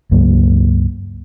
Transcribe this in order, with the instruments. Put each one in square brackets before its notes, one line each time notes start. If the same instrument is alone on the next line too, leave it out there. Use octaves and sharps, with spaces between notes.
[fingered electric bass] C#2 G2 F#3 A#3